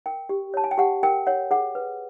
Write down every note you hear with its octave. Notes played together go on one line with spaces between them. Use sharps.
A#4 G5
G4
C#5 A5
G#5
G5
G4 F#5
A#4 G5
C#5 F#5
G#4 F#5
B4